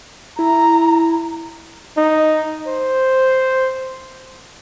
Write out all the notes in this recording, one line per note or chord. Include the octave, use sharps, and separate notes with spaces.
E4 A#5
D#4
C5